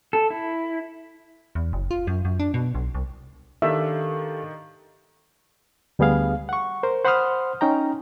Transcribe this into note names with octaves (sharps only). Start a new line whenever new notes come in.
A4
E4
E2
F#1
F4
F#2
F#2
D4
B2
B1
C2
D#3 D4 G4 A4 E5 F5
D2 G3 B3 G#4 F5
F#5 C#6
A#4 C5
C5 F#5 B5 C6 D#6 F6
C#4 D#4 G5 A#5